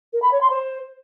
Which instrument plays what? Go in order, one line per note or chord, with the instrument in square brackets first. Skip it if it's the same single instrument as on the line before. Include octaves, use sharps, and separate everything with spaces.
[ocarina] A#4
B5
C#5
C6
C5